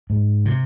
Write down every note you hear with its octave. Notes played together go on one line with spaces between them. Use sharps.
G#2
C3